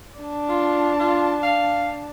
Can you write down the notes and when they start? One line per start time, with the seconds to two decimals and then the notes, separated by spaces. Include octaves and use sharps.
0.18 D4 A5
0.49 F4
0.99 F4
1.43 F5